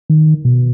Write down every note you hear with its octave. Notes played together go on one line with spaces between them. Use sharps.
D#3
B2